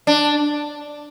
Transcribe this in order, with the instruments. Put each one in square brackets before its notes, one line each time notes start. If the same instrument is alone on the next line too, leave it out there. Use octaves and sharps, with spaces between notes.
[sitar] D4